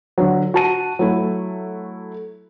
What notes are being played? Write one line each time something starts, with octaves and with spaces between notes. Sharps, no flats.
D3 F#3
F#4 A5 D#7
F#3 A3 E4